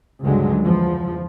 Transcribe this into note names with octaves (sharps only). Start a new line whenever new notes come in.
C#2 G2 D3 F#3 G#3
E2 F3